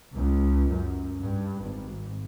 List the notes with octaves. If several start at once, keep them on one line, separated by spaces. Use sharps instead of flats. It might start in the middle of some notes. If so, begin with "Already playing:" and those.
C#2
F#2
G2
G#1